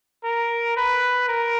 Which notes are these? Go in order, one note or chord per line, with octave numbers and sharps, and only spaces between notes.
A#4
B4
A#4